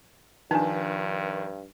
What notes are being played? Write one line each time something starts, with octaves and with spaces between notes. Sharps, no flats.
G2 D#3 F3 D4 D#4 B4